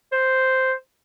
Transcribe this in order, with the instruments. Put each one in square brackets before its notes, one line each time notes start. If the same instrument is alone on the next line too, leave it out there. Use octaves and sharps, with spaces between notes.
[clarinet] C5